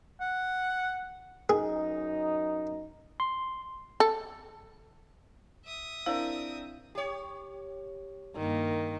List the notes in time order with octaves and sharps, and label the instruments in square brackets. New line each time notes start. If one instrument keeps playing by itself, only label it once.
[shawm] F#5
[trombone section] F#2 D#4 [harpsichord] G#4
[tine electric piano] C6
[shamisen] A4
[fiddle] E5 D#6
[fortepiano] C4 D4 A#4 [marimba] E4 [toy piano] F5
[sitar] G4 C#5
[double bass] G2 A#3 [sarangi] D#3